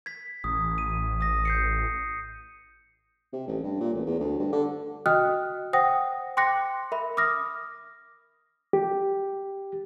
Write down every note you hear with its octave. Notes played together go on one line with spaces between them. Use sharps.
G#6 B6
A1 D#6
D#7
D#6 A#6
G6 C7 C#7
C3
A1
G2
A#2
A1
E2
D2
G2
D3
F#4 D#5 G5 D#6 F6 F#6
C5 F#5 G5 D#6 A#6
G5 C6 D6 F#6 A#6 C#7
A#4 E5 B5
D6 D#6 F6 A#6
G4